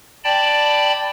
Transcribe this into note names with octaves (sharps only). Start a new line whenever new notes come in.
D5 G5 A5 B5